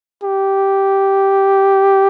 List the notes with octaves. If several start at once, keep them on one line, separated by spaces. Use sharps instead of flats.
G4